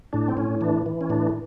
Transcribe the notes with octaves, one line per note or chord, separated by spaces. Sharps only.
A2 D4
C4
A2 C#4
E3 D4
E3
C#4
A2 D4